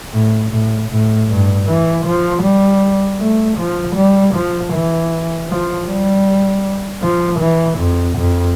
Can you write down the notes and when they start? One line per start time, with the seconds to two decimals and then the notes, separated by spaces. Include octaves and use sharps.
0.14 A2
0.52 A2
0.90 A2
1.29 G2
1.67 E3
2.06 F3
2.43 G3
3.19 A3
3.58 F3
3.96 G3
4.34 F3
4.73 E3
5.49 F3
5.87 G3
7.02 F3
7.39 E3
7.78 F2
8.17 F2